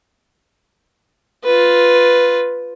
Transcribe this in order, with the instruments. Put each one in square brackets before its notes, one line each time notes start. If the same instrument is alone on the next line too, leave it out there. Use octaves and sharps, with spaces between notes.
[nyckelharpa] F4 B4